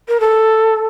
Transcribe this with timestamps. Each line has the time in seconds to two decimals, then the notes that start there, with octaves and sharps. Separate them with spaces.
0.08 A#4
0.20 A4